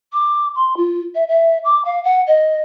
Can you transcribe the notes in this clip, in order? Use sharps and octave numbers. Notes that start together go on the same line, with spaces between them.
D6
C6
F4
E5
E5
D6
F5
F#5
D#5